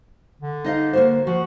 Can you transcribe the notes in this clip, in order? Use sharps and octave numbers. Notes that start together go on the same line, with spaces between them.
D3
D#4 D#5 F5
A#3 F#4 C5
F3 F#4